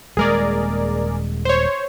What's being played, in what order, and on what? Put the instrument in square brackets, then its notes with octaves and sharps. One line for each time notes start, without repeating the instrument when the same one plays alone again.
[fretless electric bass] D#1 G#3 A#3 [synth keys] G#4 A#4 D5
[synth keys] C5 C#5